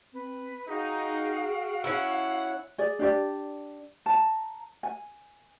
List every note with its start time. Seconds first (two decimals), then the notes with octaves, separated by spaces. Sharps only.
0.13 C4 B4
0.68 D#4 F#4 G#4 F5 G5
1.84 C#4 E4 F#5
2.78 G#4 D5
2.99 D4 G4 D5
4.06 A5 A#5
4.83 G#5